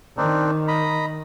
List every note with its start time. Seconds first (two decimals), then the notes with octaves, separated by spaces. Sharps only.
0.17 D#3 C4 D4 D#4
0.68 D#5 A#5 B5